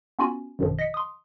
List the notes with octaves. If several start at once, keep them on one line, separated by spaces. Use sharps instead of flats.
B3 C#4 F4 F#4 G#5 B5
A1 F#2 B2 D3 D#3 F3
D#5 A#6 B6 C#7
C6 D#6